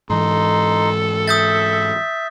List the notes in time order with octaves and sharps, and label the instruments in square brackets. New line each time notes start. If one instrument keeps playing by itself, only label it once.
[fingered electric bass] G#2 E3 [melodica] D#4 C6 [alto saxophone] A4
[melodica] E5 [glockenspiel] D#6 G6 A6